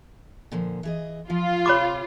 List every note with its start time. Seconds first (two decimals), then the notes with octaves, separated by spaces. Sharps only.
0.52 A#2 D3 F3
0.83 E3 G#4 D#5
1.30 F3 F4
1.66 C3 G#4 C#5 B5 D6